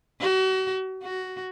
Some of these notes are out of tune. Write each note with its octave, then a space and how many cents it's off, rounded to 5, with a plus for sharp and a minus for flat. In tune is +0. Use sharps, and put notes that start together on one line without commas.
F#4 +35
F#4 +10